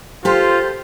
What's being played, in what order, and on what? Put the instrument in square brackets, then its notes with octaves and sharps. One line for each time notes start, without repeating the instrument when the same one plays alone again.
[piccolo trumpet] F4 [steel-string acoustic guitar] G4 A4 [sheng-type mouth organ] C5